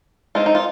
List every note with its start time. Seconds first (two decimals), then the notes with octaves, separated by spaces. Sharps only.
0.35 G#3 C4 D#4 F4
0.46 D#4
0.55 F4